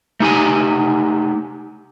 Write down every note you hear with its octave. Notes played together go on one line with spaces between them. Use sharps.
A3 D#4 G4 G#5